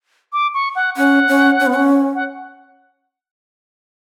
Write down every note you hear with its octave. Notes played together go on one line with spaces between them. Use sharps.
D6
C#6
F#5
C#4 F#5
C#4
C#4
B3
C#4
F#5